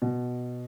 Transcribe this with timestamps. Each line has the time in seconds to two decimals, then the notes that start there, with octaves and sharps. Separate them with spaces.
0.02 B2